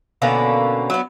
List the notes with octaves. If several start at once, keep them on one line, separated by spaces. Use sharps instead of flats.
B2 D3 A#3 C#4
F#3 B3